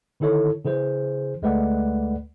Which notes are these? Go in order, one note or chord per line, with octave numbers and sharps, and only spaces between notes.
D3 D#3 E4 A4 C#5
C#3 E3 G#4 C5
D2 G#3 A3 B4 D5 F#5